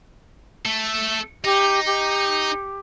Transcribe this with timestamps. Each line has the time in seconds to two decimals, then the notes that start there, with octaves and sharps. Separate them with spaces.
0.65 A3 A4
1.44 D#4 G4
1.86 G4